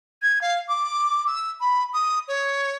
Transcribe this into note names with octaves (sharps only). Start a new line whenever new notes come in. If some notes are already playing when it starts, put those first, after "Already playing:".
G#6
F5
D6
E6
B5
D#6
C#5